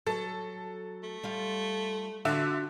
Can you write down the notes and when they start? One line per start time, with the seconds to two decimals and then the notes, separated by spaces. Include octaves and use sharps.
0.07 F#3 A4
1.03 A3
1.23 G3 F4 F5
2.25 D3 D4 F4 F#4 E5